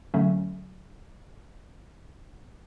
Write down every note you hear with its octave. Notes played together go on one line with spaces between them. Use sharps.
D3 F#3 A3 C#4